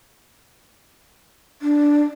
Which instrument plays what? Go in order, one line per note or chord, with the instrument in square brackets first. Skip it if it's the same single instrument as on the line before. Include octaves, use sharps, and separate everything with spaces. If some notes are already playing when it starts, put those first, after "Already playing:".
[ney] D4